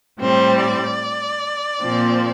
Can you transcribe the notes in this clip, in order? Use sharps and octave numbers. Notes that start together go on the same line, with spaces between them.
A2 G3 C4 C5
D5
A#2 F3 C4